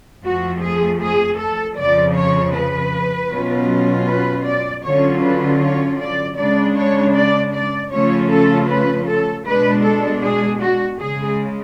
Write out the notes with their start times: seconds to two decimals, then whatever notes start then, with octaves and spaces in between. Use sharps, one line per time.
0.23 F2 F3 A3 F#4
0.61 G#4
1.00 G#4
1.38 A4
1.77 F2 C#3 F3 D5
2.15 C#5
2.54 B4
3.31 B2 F#3 C#4 F4
4.07 B4
4.46 D5
4.84 D3 F#3 C#4 F4 C#5
5.23 B4
5.62 C#5
6.00 D5
6.38 C#3 G#3 D4 D5
6.76 C#5
7.15 D5
7.54 D5
7.92 C#3 F3 A3 C#4 F4 C#5
8.31 A4
8.69 B4
9.08 A4
9.46 B2 G#3 D4 B4
9.84 A4
10.23 G#4
10.61 F#4
11.00 C#3 G#3 G#4